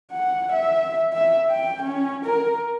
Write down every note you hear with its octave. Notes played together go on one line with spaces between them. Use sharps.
F#5
E5
E5
G5
C#4
A#4